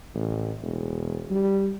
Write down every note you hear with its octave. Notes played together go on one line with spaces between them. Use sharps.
A1
E1
G3